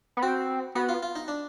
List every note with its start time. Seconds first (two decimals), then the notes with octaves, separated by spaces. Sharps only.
0.17 B3
0.22 C4 F#4
0.75 B3 F#4
0.89 F4
1.03 F4
1.16 D#4
1.28 D4